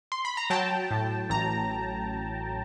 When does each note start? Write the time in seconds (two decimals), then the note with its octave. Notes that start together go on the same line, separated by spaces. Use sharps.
0.12 C6
0.25 B5
0.37 A#5
0.50 F#3 G5 A5
0.91 A2
1.30 A1 A#5